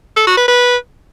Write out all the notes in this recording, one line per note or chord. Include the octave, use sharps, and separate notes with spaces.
A4
F#4
B4
B4